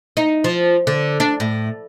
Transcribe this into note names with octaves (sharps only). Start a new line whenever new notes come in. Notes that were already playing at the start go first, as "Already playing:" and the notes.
D#4
F3
D3
D4
A2